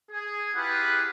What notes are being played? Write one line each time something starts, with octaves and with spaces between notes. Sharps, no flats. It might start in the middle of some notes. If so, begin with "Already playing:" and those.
G#4
E4 F4 G4 G#4 B4 F#5